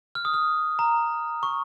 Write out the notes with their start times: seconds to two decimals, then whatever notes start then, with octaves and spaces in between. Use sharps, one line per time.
0.15 F6
0.25 D#6
0.34 F6
0.79 A#5
1.43 C#6